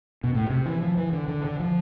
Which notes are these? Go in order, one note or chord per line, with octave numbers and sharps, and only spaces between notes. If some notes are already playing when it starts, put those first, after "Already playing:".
B2
A2
C3
E3
F3
E3
D3
D3
D3
F3